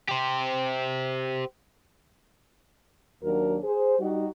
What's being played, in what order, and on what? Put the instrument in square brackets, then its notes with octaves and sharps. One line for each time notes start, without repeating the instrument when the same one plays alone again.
[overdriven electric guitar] G4 C5
[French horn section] D#2 F#3 D4 F#4 A#4
G#4 C5
G3 D#4 F#4